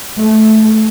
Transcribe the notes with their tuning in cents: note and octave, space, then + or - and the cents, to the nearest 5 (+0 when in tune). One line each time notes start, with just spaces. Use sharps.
A3 -15